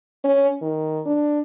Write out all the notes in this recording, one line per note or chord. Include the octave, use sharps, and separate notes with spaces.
C#4
D#3
D4